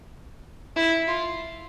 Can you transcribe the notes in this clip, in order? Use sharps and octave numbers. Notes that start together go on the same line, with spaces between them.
E4
F4